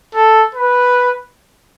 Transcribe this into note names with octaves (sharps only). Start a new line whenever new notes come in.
A4
B4